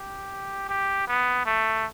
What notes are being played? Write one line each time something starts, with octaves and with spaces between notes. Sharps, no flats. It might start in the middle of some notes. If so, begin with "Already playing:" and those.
Already playing: G4
G4
B3
A3